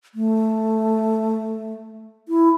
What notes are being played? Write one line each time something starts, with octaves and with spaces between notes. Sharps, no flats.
A3
E4